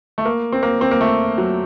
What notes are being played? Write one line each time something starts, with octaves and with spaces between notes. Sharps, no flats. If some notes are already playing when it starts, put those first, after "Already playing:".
A3
A#3
C4
A#3
C4
A#3
A3
F#3